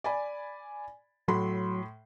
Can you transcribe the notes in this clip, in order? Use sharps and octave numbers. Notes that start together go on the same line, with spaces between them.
D5 G#5 B5
A2 F#3 B5 C6